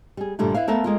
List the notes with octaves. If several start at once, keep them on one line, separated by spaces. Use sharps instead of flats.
G3 G#4
G2 A#2 D3 G3 A3
E4 B4 E5 F5
A3 B3 A#4 E5 F5 A5
G#3 A#3 F4